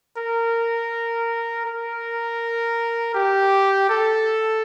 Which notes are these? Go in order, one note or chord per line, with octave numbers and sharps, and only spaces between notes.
A#4
A#4
G4
A4